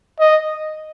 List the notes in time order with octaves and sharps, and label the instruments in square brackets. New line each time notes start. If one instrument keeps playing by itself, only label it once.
[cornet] D#5